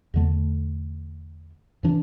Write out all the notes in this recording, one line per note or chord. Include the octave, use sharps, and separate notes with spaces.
E2 D3 A3
A2 E3 D4